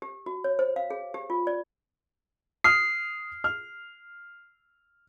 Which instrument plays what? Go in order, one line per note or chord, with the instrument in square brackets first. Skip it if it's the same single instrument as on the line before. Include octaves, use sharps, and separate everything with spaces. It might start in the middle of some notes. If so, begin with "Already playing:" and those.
[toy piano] G4
F#4
C#5
C5
F5
G#4
G4
F4
D5
[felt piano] D#6 F6 [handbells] C7
[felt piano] F6